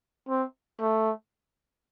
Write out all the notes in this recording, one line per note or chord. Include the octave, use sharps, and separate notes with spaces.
C4
A3